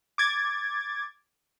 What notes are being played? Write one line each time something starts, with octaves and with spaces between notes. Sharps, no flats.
D6 G#6 A6